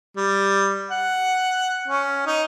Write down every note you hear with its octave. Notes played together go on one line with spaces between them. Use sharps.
G3
F#5
C#4
D#4